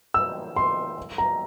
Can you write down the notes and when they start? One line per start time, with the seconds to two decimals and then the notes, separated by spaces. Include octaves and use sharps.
0.14 E6
0.56 C6
1.18 A#5